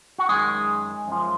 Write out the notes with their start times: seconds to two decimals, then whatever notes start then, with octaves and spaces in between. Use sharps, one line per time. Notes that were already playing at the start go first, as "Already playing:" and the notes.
0.18 F#4
0.29 F#2 D#3 G#3 G#4
1.08 F#2 F3